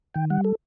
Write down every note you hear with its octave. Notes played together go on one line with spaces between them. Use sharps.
D#3 G5
G3 F#5
A4